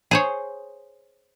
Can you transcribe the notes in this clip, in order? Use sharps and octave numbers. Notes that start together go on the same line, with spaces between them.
G#4 C5 C#5